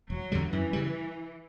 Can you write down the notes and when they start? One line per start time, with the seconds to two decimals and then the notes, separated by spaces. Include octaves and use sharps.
0.10 E1 F#3
0.32 E2 D3 G3
0.52 F#2 E3
0.73 C#3 G3